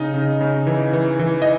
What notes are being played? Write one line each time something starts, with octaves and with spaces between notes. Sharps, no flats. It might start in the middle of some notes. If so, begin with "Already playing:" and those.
Already playing: C#3 D#4 D#5
C#3
C#3
E3
E3
E3
D#5